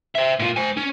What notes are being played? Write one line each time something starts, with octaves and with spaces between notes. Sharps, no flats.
C5 E5
A#2 F4
C5 G#5
C#4